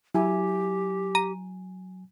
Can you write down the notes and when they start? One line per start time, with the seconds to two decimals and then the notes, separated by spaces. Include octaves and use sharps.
0.15 F#3 E4 G4 G#5
1.15 A#5 D#7